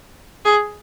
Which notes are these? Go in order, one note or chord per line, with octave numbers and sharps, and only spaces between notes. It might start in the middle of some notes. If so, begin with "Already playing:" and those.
G#4